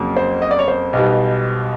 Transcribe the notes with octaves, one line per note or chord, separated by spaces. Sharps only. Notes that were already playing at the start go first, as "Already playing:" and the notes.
Already playing: F2 C#3 F#3 A#3
C5
D#5
D5
C#5
C5
B1 B2 G3